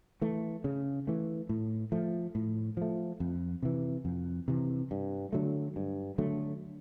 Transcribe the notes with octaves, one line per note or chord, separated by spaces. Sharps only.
E3 A3
C#3
E3 A3
A2
F3 A3
A2
F3 A3
F2
C3 E3
F2
C3 E3
G2
D3 F#3 A3
G2
D3 F#3 A3